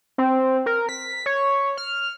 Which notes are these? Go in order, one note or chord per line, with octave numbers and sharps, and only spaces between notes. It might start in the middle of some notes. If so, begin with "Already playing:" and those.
C4
A#4
B6
C#5
F6